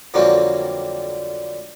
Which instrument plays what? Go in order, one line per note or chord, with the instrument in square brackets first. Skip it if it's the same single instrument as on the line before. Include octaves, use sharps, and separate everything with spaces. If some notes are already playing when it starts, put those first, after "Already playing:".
[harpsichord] F2 D3 F#3 G3 A#3 C4